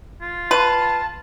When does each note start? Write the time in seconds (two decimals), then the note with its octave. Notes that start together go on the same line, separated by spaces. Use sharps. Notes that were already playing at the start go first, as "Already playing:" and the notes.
0.22 F4
0.51 B4 A5